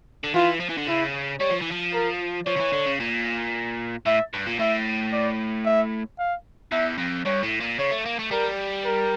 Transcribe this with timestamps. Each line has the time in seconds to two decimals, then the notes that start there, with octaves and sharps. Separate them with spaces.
0.24 D3
0.34 E3 F4
0.60 F3
0.69 E3
0.78 D3
0.87 C#3 E4
1.40 G3 C#5
1.50 F3
1.61 E3
1.71 F3
1.93 A#4
2.46 F3 C#5
2.56 D3
2.60 E3
2.73 D3
2.86 C#3
3.00 A#2
4.06 A2 E5
4.33 G2
4.46 A#2
4.59 A2 E5
5.13 D5
5.65 E5
6.19 F5
6.72 E2 E5
6.98 F2
7.26 G2 C#5
7.43 A2
7.61 A#2
7.79 C#3 C#5
7.91 A3
8.06 A#3
8.19 A3
8.31 G3 A#4
8.85 A#4